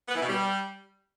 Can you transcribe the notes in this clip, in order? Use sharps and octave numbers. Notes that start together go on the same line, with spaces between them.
B3
E3
B2
G3